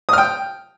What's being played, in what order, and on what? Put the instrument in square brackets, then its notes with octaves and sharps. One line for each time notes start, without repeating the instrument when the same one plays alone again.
[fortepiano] D#6
F6
G5